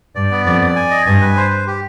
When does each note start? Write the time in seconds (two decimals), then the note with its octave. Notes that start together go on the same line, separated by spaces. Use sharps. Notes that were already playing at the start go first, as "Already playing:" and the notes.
0.15 G2 D5
0.31 B3
0.46 F2 D5
0.61 D5
0.76 G#5
0.90 D#5
1.06 G2 G#5
1.21 B4
1.36 C5
1.51 C5
1.67 G4